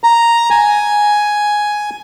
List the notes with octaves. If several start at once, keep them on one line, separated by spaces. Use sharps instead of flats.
A#5
G#5